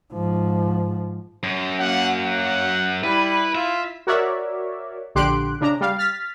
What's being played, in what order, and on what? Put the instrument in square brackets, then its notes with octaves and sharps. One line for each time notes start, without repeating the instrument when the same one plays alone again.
[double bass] G#2 F3
[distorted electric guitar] F#2
[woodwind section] F#3 A#3 [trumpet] F#5
[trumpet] F#5
[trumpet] G3 [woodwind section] E4 [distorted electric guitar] B4
[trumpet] F4 [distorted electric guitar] E5
[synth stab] F#4 A#4 C#5 D5 E5
A#1 D3 G4 C6 F#6 D7
C#3 D4 A#5
G3 F5
F6 A6 B6